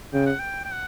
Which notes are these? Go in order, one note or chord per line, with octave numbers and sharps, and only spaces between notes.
C#3 G5
F#5
G5
G5
F#5